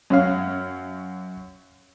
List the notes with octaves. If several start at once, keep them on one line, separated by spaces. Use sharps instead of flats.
F#2 C#4 F5